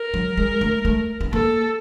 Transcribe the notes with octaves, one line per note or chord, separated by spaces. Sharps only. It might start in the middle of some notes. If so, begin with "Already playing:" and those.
Already playing: A#4
F#3
G#3
A3
A3
B3
A#3 A4